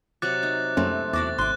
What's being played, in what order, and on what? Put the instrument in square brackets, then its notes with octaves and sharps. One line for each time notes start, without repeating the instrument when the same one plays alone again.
[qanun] C3 F#3 C#6 [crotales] D6 F#6 A6
[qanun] D#4
[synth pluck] F#2 A#3 C#4 [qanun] G3 A3 A4 [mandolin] C4
[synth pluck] E2 [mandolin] D4 F#4 D6 [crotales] A6
[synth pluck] G#1 [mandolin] C6 D6 [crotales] F#6